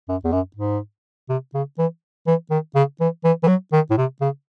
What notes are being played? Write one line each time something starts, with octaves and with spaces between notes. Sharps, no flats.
F#2
E2
F#2
G#2
C3
C#3
E3
E3
D#3
C#3
E3
E3
E3
F#3
D#3
A2
C3
C#3